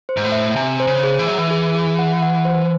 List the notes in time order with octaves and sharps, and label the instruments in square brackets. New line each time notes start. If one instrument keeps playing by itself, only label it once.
[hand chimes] C5
[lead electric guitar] G#2
A2
[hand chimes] E5
[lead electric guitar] C3 [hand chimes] G#5
[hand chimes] C5
[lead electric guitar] C#3
[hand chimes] G#4
[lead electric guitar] E3
[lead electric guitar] F#3 [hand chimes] E5
[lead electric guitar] E3
[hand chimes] G#4
G#4
F#5
F#5
C5